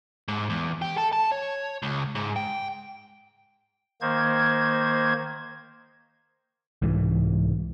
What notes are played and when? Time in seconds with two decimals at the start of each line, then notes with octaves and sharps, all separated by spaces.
0.28 G#2
0.50 E2
0.82 G4
0.98 A4
1.13 A5
1.32 C#5
1.83 C#2
2.15 G#2
2.36 G5
4.01 D#3 A#3 C5 G#6
6.82 C2 G#2 E3